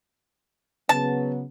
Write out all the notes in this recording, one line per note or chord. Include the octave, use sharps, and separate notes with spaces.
C#3 F#3 B3 A5